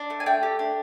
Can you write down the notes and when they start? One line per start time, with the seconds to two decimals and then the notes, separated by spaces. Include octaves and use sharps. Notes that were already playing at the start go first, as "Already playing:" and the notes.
Already playing: D4
0.10 A3
0.20 G#5
0.26 A3 G5
0.43 G4
0.59 D4